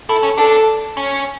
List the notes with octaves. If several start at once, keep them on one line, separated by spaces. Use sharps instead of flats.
E4 A4
C#4
D4 A4
C#4